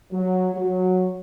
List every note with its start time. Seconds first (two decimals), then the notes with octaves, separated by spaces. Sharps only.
0.12 F#3
0.54 F#3